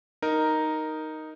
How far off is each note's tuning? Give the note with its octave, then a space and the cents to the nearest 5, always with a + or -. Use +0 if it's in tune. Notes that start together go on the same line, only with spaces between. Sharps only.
D#4 +0 A#4 +0